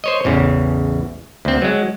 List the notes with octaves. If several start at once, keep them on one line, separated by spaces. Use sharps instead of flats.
C5 C#5 D#5
A1 E2 C#3
D2 C4
F#3 G#3